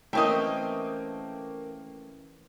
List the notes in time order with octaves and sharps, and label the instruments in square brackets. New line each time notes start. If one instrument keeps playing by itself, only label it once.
[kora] E3 C#4 E4 [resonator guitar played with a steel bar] A3 C4 D#5 [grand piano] A#3 G5